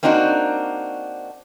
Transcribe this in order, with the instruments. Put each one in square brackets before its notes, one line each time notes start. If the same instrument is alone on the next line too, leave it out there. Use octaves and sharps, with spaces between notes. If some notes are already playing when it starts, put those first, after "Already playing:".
[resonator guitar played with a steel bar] A#3 C4 D4 D#4 F4 F#4